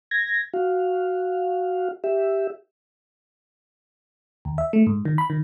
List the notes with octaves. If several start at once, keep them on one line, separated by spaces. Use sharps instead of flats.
G#6 A#6
F#4 F5
G4 E5
D#2
E5
A3
G#2
D#3
B5
D#3